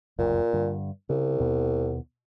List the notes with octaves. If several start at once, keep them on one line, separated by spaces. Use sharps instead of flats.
F1 C#2 F#2 A#2
G2 D3
C2 C#3
D#2 B2 B3